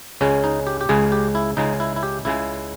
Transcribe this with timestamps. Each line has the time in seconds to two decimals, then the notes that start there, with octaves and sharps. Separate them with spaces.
0.21 C#2 C#3 G#3 C#4
0.44 D#4
0.67 G4
0.81 G4
0.89 C#2 C#3 G#3 C#4 G#4
1.12 G4
1.35 E4
1.57 C#2 C#3 G#3 D#4
1.80 E4
1.96 E4
2.03 G4
2.25 C#2 C#3 G#3 E4